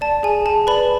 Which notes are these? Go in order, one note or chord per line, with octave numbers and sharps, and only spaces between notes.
D5 A5
G#4 G#5
G#4 A5
B4 D5 B5